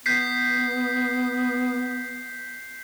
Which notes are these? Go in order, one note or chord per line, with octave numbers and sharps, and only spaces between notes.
B3 G6 B6 C7